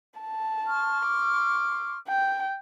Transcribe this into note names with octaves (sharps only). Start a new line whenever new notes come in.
A5
C6 C#6 F6
D6
G5